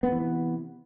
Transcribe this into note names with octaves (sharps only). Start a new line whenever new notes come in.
C3 E3 B3